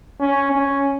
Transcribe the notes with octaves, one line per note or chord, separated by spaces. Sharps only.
C#4
C#4